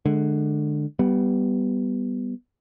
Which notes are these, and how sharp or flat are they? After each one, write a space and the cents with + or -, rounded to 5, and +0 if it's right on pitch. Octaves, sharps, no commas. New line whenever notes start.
D3 +20 G#3 +25
G3 -10 B3 +0